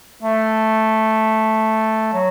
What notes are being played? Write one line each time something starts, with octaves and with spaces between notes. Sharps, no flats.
A3
F#3